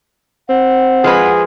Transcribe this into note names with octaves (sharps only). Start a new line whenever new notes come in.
C4 F#5
F3 G#3 G#4 B4